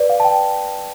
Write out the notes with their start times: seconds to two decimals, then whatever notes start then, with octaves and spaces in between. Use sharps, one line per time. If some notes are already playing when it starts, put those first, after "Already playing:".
Already playing: B4 D5
0.10 F5
0.20 A5
0.25 G5